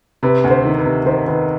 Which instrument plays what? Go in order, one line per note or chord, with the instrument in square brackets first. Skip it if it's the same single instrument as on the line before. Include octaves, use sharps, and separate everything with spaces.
[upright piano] C3 [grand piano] B4
[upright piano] D2
[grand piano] C5
[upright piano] D#3
[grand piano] B4
[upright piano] C3
[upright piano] D#3 [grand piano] C5
[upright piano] D#3 [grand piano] B4